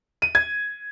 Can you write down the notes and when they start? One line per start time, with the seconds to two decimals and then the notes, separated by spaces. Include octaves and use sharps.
0.22 D#7
0.35 G#6